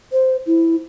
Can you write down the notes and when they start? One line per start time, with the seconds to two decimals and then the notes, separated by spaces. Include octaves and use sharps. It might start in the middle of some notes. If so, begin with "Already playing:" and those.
0.12 C5
0.46 E4